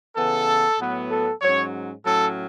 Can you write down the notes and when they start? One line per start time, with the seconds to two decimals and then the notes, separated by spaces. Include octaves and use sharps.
0.15 C#3 E3 B3 A4
0.79 A2 F#3 B3
1.10 A4
1.41 G#2 F#3 C#4 C#5
2.05 A2 F#3 C#4 A4